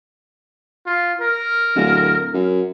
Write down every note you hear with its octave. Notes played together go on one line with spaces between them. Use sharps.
F4
A#4
D1
F#2